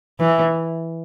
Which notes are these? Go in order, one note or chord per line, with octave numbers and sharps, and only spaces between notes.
E3